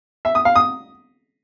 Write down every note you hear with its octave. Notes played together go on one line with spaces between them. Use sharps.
E5
D#6
F5
D#6